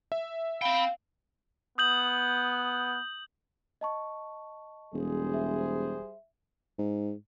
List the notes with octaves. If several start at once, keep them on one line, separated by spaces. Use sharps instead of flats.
E5
C4 F5 G5 B5
B3 D#6 G6 F#7
D#5 A5 C#6
E1 G3 G#4 C5
E5
G#2